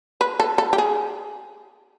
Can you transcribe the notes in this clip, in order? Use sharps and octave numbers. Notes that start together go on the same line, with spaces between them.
B4
A4
A4
G4
G#4